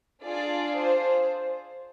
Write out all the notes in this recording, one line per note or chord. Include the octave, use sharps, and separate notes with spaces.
D4 F4 G#4 D5
C5